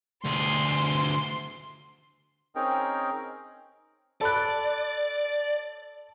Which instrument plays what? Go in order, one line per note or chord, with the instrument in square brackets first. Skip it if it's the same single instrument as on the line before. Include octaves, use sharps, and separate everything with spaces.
[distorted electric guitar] D2 G#4 [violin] C6
[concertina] C4 C#4 D#4 G#4 A#4 G5
[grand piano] A4 B5 F#6 [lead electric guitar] D5